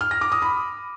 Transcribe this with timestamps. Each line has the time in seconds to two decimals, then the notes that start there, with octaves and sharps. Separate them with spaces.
0.01 F6
0.11 A#6
0.21 D6
0.32 D#6
0.42 B5